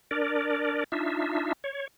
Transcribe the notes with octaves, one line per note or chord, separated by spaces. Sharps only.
D4 A#4 D5
D4 D#4 F4 E5
C#5